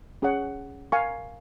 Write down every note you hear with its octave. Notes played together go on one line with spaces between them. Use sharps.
C#4 G#4 C#5 F#5
A#4 F5 G#5 C#6